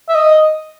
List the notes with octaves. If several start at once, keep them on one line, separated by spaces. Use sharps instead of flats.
E5
D#5